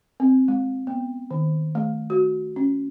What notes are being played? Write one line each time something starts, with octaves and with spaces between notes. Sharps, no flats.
C4
G#3
B3
D#3
A3
F#4
C#4